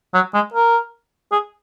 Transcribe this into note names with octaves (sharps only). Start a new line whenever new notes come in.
F#3
G#3
A#4
G#4